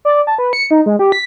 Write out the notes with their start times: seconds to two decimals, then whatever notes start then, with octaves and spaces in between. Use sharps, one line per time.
0.05 D5
0.27 A5
0.38 B4
0.53 C#7
0.71 D#4
0.86 G#3
0.99 G4
1.12 B6